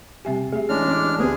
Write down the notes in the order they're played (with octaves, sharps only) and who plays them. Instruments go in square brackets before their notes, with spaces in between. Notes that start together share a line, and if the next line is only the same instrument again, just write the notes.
[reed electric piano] C3 G3 G4 [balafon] C4 E5 G#5
[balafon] A3 G4 E5 [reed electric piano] G#4
[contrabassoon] A1 [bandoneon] G#3 D4 F6 [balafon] C#5
[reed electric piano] C#4 D6
[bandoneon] D2 G#4 [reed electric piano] A3 B3 C4 [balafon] G4